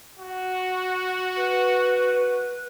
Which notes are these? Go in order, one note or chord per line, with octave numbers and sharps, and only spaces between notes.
F#4
B4